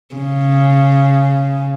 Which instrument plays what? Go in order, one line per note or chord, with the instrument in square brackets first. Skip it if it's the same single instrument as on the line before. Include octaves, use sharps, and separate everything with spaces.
[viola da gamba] C#3